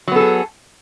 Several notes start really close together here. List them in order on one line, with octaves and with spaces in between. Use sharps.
F#3 B3 A4 G#4